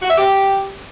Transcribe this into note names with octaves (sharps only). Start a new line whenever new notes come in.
F#4
E5
G4